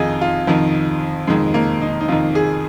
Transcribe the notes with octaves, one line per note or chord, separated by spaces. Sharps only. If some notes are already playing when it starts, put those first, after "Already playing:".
Already playing: F2 D#3 D#4 F4 G#4
F4
F2 D#3 F3
F2 D#3 G#3
A#3
D#4
D#4
F2 D#3 F4
G#4